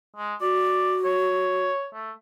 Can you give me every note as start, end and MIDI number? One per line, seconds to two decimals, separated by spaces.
0.16 0.34 56
0.41 1.66 66
0.41 0.99 74
1.05 1.89 73
1.95 2.11 57